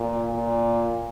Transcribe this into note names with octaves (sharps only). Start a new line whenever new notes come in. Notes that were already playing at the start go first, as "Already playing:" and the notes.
Already playing: A#2
A#2